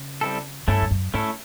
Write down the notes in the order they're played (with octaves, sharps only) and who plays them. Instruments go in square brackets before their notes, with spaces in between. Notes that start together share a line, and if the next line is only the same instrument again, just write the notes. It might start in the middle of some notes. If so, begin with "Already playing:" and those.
Already playing: [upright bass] C#3
[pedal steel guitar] G3 C4 E4 A4
[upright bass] G2 [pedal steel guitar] A3 C#4 E4 A4
[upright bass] F2
F#2
[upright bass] G#2 [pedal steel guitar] A3 C#4 E4 A4